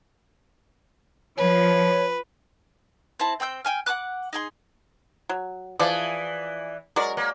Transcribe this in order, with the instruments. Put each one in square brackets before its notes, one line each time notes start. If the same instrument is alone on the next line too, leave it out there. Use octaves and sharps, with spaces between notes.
[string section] F3 [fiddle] B4 [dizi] C#5
[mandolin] C4 E4 A5
C4 G5 E6 G6
G5 G#5 F6
F#5 G#5 D6 F#6
D#4 G#4 C6
[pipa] F#3
[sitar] E3 D5 [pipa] F3 G#4
[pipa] F#3 G#3 [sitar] A#4 D5
[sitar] A#3